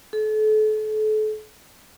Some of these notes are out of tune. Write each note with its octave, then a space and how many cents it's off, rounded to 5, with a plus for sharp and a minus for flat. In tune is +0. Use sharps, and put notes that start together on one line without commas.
A4 -35